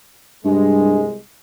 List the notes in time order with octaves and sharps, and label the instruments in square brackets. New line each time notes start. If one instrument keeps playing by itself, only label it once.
[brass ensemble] C2 G#3 [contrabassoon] G2